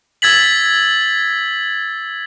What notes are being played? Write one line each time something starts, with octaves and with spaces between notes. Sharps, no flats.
E6 G#6 A6 B6 F#7